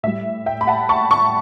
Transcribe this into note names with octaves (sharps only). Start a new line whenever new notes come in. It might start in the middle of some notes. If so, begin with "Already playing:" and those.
A2 G3 E5
E5 G5
B5
F#5 A5
A5 C#6
A5 C#6